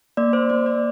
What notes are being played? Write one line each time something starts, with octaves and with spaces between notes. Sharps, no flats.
A#3 D5
C5
A#3 D5
D5